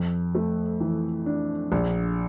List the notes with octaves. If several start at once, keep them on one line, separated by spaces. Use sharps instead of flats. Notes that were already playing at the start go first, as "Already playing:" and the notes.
Already playing: F2
A3
E3
D4
A#1